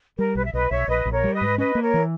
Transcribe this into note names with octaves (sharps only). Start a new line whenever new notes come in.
G3 A#4
B1 B4
E5
B1 B4 D#5
B1 C#5 E5
A#1 B4 D#5
A#1
A#4 C#5
G3
B4 D#5
G#2
C#4 B4 D#5
A#3
A#4 C#5
E3